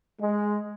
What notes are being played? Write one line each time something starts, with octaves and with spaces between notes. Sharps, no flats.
G#3